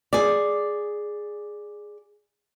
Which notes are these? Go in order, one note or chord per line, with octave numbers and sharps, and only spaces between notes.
G#4 D5